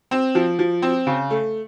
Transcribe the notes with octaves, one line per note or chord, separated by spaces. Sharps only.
C4
F3
F3
C4
C#3
A3